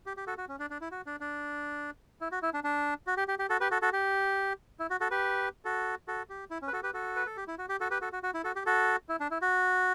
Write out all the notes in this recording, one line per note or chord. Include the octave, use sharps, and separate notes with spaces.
G4
G4
F#4 A4
F#4
C#4
D4
D4
E4
F#4
D4
D4
E4
F#4
E4
D4
D4
F#4
G4
G4
G4
F#4 A4
G4 B4
F#4 A4
F#4 A4
G4
E4
F#4
F#4 A4
G4 B4
F#4 A4
F#4 A4
G4
E4
C#4
B4
F#4 A4
G4 B4
F#4 A4
B4
A4
G4
E4
F#4
G4
F#4 A4
G4 B4
F#4 A4
F#4
F#4
E4
F#4 A4
G4
F#4 A4
E4
D4
E4
F#4